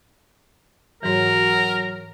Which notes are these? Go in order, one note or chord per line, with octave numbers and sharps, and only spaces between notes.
G#2 E3 F#3 A#4